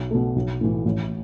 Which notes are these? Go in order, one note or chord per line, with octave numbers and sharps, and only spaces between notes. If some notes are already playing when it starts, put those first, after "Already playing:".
Already playing: B1
B2 A3
B1
A2 E3
A1